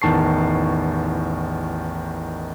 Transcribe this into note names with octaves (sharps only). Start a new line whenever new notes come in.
A1 E2 D#3 A5 C#6 C7